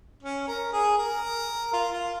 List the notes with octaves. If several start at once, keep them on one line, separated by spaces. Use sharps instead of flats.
C#4
A#4
G#4
A#4
F4
F4